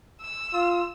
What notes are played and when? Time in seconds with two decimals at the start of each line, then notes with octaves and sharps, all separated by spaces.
0.21 E6
0.53 F4